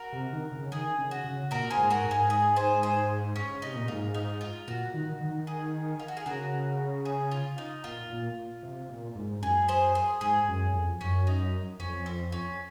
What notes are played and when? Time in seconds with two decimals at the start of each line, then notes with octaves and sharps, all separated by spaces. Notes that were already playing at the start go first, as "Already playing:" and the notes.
Already playing: F#4 A#4
0.13 C3
0.33 D#3
0.52 C#3
0.72 D#3 G#4
0.98 C#3
1.11 F#4
1.24 C#3
1.51 A#2 F#4 A#4
1.71 G#4 C5
1.77 G#2
1.90 F#4 A#4
2.04 G#2
2.11 G#4
2.30 G#4
2.56 G#4 C5
2.83 G#4 C5
3.36 C#4
3.51 C#3
3.62 C3 D#4
3.76 A#2
3.88 G#2 F4
4.14 D#4
4.41 F4
4.68 A#2 F#4
4.94 D#3
5.21 D#3
5.47 G#4
6.00 F4
6.08 F#4
6.17 G#4
6.26 C#3 F#4 A#4
7.05 G#4
7.31 F4
7.58 D#4
7.84 A#2 F4
8.10 A#2
8.63 C3
8.89 A#2
9.15 G#2
9.42 F#2 G#4
9.69 G#4 C5
9.95 G#4
10.21 G#2 G#4
10.48 F#2
10.74 F2
11.01 F#2 C#4
11.27 D#4
11.80 F2 C#4
12.06 C4
12.32 C#4